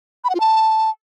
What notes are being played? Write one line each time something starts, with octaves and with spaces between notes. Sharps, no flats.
B5
F#5
F4
A5